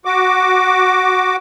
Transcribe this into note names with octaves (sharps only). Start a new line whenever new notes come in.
F#4 D6